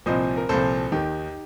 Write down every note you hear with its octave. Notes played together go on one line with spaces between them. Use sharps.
C2 A#2 F3 C5 D#5
A#4
C2 A#2 F3 A4 C5
D#2 D#3 D#4 G4